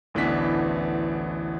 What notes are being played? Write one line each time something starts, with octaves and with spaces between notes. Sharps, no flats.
A1 D2 E3 B3 D4 B6